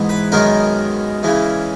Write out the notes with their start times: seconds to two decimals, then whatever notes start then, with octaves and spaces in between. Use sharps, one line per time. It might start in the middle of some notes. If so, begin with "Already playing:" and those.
Already playing: G#2 E3 G#3 B3 D#4
0.09 B4
0.32 F#2 D#3 G#3 B3 D#4 A#4
1.23 C#3 E3 G#3